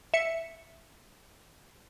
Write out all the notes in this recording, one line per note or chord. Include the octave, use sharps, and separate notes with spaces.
E5 C#7